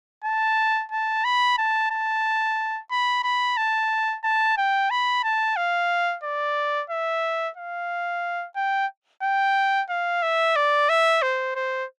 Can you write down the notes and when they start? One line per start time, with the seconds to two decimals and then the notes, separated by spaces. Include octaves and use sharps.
0.24 A5
0.92 A5
1.24 B5
1.58 A5
1.91 A5
2.91 B5
3.24 B5
3.57 A5
4.24 A5
4.57 G5
4.91 B5
5.24 A5
5.57 F5
6.23 D5
6.90 E5
7.57 F5
8.56 G5
9.23 G5
9.90 F5
10.22 E5
10.56 D5
10.89 E5
11.22 C5
11.56 C5